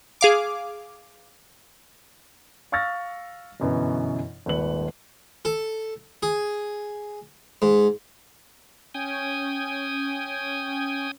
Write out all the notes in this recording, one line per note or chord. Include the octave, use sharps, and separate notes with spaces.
G#4 F5 D6
F5 C#6 E6 F6 A6 A#6
G1 F#2 B2 E3
D#1 G#1 B4 F#7
A4
G#4
G#2
C#4 G5 G#5 D#6